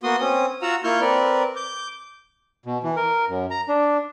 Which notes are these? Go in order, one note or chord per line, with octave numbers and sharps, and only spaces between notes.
A#3 B3 F#4 C6 D#6
C4 C#4 D#6
F4 F#4 F#5 A#5 E6
A#3 E4 F4 C#6 F6 G6
C4 A#4 B4 D5
D6 G6
B2
E3
A#4
F#2
A#5
D4